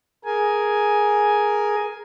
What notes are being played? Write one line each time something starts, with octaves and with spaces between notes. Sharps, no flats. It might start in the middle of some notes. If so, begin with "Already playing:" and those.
G#4 A#4 G#5